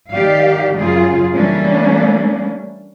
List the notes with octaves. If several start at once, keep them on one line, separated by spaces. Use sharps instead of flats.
D#3 G4 D5 F5
F#2 C#3 F4 G#4
E3 G3 A3 A#3 C#4 D4